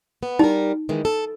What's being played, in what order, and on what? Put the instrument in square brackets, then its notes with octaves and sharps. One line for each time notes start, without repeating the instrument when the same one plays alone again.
[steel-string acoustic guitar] B3
[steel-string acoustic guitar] G3 A#4 [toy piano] D#4
[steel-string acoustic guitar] D#3 E3 G#3
A4